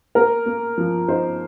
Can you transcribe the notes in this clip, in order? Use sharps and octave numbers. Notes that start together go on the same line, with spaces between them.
A#3 A#4
A#3
F3
D#4 C5